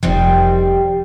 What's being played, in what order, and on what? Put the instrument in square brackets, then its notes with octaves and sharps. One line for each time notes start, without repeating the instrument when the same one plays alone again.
[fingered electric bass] F1 F3 [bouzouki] D#3 G3 C4